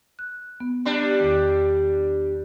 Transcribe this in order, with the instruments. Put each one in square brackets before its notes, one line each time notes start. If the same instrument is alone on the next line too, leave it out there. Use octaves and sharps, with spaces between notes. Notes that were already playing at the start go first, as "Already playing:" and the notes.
[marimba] F#6
B3
[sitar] G3 D4
[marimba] E2 D#3